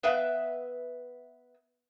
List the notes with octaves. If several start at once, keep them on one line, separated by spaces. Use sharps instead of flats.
B3 B4 E5 F5